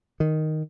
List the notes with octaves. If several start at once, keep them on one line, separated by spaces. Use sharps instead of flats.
D#3